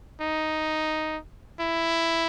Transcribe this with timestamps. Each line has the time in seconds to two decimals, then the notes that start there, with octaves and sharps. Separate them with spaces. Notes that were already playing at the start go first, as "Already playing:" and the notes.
0.21 D#4
1.61 E4